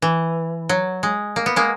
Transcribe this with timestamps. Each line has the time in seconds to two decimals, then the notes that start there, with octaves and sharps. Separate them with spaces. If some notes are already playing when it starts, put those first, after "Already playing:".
0.02 E3
0.69 F#3
1.03 G#3
1.36 A#3
1.46 B3
1.56 G#3 A#3